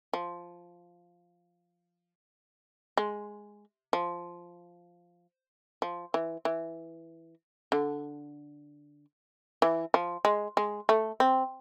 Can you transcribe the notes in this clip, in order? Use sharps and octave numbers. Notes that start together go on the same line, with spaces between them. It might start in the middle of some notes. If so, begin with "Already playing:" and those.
F3
G#3
F3
F3
E3
E3
D3
E3
F3
G#3
G#3
A3
C4